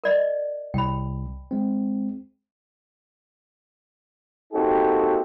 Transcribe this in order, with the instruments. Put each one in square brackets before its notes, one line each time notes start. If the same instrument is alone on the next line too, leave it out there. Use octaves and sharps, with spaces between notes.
[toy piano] A#4 D5 D#5
[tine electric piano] C2 [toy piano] G5 B5
[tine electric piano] G#3 C4
[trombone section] A#3 C4 D#4 F#4 G4 A4